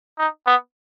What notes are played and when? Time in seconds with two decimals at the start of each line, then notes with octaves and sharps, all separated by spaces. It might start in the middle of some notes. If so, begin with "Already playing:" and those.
0.19 D#4
0.47 B3